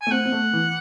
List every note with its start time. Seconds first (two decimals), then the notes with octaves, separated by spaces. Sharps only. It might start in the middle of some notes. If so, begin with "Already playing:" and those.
0.01 G#5
0.07 A3
0.11 C4 F#5
0.25 C4
0.32 A3
0.53 E3